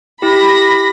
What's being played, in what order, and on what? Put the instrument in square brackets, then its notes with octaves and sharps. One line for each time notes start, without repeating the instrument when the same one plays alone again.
[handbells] E4 G4 [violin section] B5 A#6